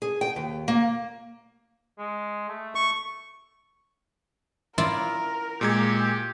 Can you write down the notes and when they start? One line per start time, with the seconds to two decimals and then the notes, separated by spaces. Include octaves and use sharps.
0.02 G#4
0.21 G5
0.36 D#2
0.68 A#3
1.98 G#3
2.48 A3
2.75 C#6
4.78 E4 F4 A#4 D5
5.61 A#2 G#3 G4 G#6